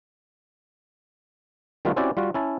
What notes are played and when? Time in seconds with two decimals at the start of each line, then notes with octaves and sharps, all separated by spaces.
1.85 D#3 G3 A3 B3 F4 F#4
1.96 C4 C#4 E4 F#4 G4 D5
2.17 G3 F4 F#4
2.34 C#4 E4 A5